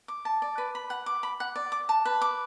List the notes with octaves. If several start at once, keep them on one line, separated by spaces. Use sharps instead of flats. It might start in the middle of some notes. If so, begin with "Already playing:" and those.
D6
A5
D5
B4
B5
F#5
D6
B5
F#5
D5
D6
A5
B4
D6